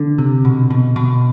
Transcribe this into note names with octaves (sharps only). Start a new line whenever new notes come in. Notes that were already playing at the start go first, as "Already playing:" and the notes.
Already playing: D3
C3
B2
B2
B2